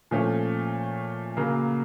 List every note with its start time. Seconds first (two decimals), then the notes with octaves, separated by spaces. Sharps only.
0.11 A#2 F3 A3 C#4
1.37 C#3 F#3 A#3